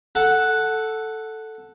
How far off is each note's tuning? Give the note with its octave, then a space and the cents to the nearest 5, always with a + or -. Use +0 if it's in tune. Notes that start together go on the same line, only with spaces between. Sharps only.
A4 +0 F#5 +0